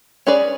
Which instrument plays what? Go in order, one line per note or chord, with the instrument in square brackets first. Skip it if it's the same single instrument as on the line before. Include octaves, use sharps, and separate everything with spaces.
[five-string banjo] C#4 G#4 B4 D5